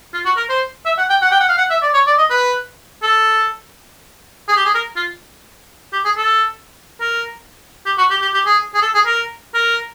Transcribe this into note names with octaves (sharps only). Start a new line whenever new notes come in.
F4
F#4
A#4
C5
E5
F#5
G5
F#5
G5
F#5
F5
F#5
E5
D5
C#5
D5
D#5
B4
A4
G#4
G4
G#4
A#4
F4
G4
G#4
A4
A#4
G4
F#4
G4
G4
G4
G#4
G#4
A4
G#4
A#4
A#4